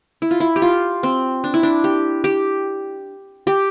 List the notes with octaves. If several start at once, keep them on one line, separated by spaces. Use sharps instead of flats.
E4
F4
E4
G4
F4
C4
D4
E4
D4
G4
G4
G4